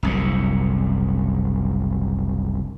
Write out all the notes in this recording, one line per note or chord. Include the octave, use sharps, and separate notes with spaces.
F#1 C2 A#2